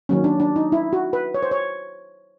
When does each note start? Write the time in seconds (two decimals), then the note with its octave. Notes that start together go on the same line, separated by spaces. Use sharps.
0.09 D#3 F#3 A#3 C#4
0.24 D4
0.40 D4
0.56 D#4
0.72 E4
0.93 F#4
1.13 B4
1.34 C#5
1.42 C5
1.51 C#5